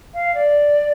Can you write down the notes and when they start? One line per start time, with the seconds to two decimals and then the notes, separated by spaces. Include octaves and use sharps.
0.13 F5
0.34 D5